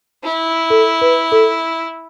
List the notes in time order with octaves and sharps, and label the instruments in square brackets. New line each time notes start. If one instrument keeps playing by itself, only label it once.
[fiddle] E4
[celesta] A4
B4
A4